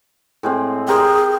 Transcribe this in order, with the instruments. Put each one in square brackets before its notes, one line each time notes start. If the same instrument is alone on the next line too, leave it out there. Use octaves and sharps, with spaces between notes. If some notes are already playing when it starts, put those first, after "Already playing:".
[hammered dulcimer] A2 G#3 C4
[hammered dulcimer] G4 A#4 C5 [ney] G#4